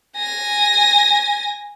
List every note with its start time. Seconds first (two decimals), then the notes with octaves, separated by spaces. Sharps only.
0.18 G#5 A#6